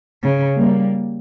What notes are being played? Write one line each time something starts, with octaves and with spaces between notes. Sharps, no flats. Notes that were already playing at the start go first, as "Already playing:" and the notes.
C#3
G3 A#3